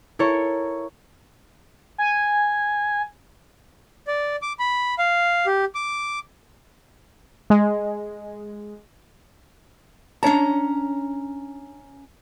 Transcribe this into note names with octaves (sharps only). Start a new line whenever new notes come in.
E4 A4 A#4 C#5
G#5
D5
D6
B5
F5
G4
D6
G#3
C#4 D4 C#5 A5 A#5